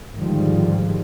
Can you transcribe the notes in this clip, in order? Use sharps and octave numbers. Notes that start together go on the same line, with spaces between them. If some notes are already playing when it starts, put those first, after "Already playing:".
G#2 D3 D#3 F3 G3 G#3